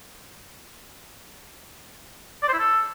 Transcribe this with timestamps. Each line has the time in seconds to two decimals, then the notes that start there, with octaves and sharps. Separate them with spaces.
2.43 D5
2.48 C5
2.53 E4
2.59 A4